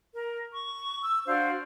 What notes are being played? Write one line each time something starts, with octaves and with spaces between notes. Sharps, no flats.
A#4
C#6
E6
D4 F#4 C5 F5